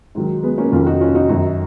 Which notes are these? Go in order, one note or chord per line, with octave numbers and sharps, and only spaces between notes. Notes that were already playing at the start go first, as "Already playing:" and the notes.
G#2 D#3 F#3
G#3 B3
A#3 C#4
F2 D#3 F#3 C#4 F4
D#4 F#4
C#4 F4
D#4 F#4
F#2 D#3 F#3 D#4 F#4